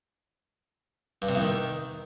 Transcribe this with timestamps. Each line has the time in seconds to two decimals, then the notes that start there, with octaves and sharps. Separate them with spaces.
1.22 G2
1.29 C3
1.35 E2
1.42 D#3